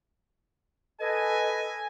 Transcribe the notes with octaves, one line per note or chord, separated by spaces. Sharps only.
A4 B4 D#5 G#5